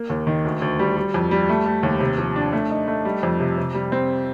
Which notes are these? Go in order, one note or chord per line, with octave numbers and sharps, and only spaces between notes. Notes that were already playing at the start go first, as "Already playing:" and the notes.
Already playing: A#3
D#2
D#3
D2
D2
G3
G3
F2
G3
A3
A3
D#2
C3
F3
D4
A3
D#4
A3
G3
F2
C3
C3
G3
C4